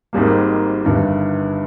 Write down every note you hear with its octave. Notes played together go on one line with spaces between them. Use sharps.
G#1 G#2 D#3 G3 A#3
G1 G2 D#3